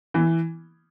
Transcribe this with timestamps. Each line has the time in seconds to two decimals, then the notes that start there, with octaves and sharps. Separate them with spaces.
0.14 E3